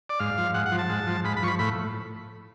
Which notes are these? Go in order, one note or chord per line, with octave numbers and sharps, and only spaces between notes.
D5
G#2 F5
F3
G#2 F#5
F#5
F3
A5
G#2
F3
G#2 B5
B5
F3 C#6
B5
A2 B5